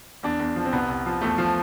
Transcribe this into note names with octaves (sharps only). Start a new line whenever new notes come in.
E2 D4
E2
F3
C4
C2 B3
C2
F3
E2 A3
F3